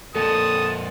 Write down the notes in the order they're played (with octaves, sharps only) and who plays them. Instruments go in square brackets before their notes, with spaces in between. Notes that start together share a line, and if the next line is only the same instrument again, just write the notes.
[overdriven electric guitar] F2 A#2 [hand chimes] A4 [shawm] A5 [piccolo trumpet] D#6